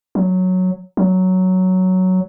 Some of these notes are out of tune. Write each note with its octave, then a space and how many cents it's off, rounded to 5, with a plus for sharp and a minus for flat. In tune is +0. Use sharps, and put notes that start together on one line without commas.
F#3 -5
F#3 +5